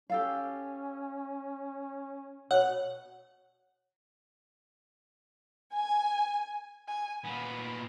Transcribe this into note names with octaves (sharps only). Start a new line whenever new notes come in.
C#4 G4 A4 F5
B2 C#5 F#5
G#5
G#5
A#2 B3 B5